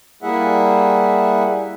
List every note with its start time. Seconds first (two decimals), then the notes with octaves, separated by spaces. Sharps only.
0.23 G3 A#3 E4 G#4 E5 F#5